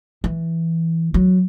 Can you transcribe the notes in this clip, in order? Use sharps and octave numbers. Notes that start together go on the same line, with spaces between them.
E3
F#3